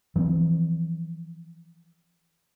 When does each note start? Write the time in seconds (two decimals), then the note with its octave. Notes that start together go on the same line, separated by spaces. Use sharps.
0.16 E3 F3 G#3 C4